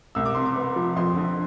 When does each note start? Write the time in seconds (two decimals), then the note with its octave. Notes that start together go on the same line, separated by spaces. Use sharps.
0.15 C2 E6
0.25 D6
0.35 C3 C6
0.45 D6
0.56 B3
0.76 F3
0.96 F2 C6
1.16 D3